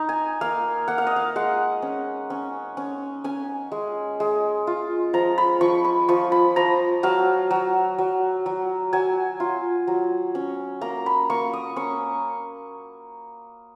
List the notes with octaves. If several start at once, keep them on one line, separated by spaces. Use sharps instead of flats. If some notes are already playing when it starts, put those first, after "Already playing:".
Already playing: D#4 A#5
G#5
A#3 F5
A#3 F#5
F5
D#5
F5
G#3 F#5
C#4
C#4
C#4
C#4 G#5
G#3
G#3
F4
F3 A#5
B5
F3 C#6
B5
F3 C#6
B5
F3 A#5
F#3 F5
F#3
F#3
F#3
F#3 G#5
F4
F#3
C#4
A#3 A#5
B5
A#3 C#6
D#6
C#4 C#6